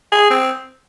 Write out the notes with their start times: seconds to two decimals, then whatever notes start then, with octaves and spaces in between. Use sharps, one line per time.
0.12 G#4
0.30 C4